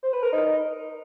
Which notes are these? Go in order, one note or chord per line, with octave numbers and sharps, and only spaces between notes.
C5
B4
A#4
D#4